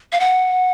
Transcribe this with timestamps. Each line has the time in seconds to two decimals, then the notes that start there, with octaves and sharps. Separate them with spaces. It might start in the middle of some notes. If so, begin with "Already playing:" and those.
0.12 F5
0.20 F#5